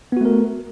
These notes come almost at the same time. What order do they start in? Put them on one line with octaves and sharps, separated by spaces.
B3 F#4 A3 A#4